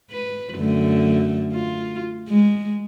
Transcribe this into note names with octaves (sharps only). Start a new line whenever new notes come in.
B4
F#2 D3 A3
F4
G#3